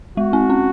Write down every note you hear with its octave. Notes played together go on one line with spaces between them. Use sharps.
G#3 F#4
C4
C#4